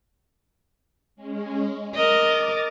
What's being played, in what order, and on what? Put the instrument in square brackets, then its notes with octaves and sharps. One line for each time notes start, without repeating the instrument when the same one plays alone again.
[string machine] G#3 C#4
[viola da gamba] A#4 D#5 [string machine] D6 A6